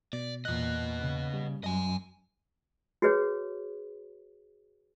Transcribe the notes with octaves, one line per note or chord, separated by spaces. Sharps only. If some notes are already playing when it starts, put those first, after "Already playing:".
B2 D5
E2 A#2 B3 D#5 F#6
C#3
G3
F#2 D#5 G#5
F#4 G#4 B4 C#5